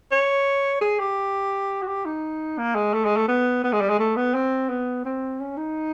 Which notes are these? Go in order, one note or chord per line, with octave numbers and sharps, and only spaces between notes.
C#5
G#4
G4
F#4
G4
D#4
A#3
G#3
A3
G#3
A3
B3
B3
G#3
G3
G#3
A3
B3
C4
B3
C4
C#4
D#4